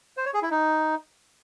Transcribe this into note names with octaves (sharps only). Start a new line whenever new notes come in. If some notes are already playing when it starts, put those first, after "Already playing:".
C5
C#5
G#4
E4
D#4